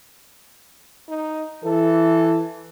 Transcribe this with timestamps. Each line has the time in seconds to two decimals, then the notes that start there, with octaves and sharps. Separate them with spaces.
1.09 D#4
1.64 E3 A4